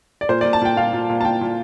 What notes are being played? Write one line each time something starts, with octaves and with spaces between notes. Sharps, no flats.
D5
A#2 C5
D5
A#2
A5
A#2 G5
A#2 F5
A#2
A#2
A5
A#2 G5
A#2